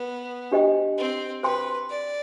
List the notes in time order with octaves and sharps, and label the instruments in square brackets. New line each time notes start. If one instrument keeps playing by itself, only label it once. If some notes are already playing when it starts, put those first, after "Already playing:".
Already playing: [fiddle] B3
[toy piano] D4 G4 C5 D#5 G5
[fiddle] C4
[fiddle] B4 [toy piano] C5 G5 C6
[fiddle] D5